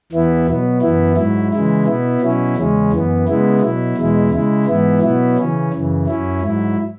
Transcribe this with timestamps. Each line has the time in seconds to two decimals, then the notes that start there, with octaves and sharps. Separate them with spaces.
0.12 E2 E3 B3 E4
0.47 B2 F#3 B3
0.82 F#2 E3 B3 E4
1.16 G#2 F#3 E4
1.52 C#3 E3 G#3 E4
1.86 B2 B3 E4
2.22 B2 F#3 C#4 E4
2.56 E2 C#3 G#3 C#4
2.91 F#2 E3 B3
3.27 C#3 G#3 B3 E4
3.61 B2 F#3 E4
3.97 E2 B2 G#3 E4
4.31 C#3 G#3 E4
4.67 G#2 E3 B3 E4
5.02 B2 F#3 B3 E4
5.37 C#3 E3 C#4
5.73 F#2 C#3 E3
6.07 F#2 F#3 C#4 E4
6.42 G#2 F#3 E4